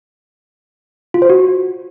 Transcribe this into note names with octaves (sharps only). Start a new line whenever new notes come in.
F4
C5
F#4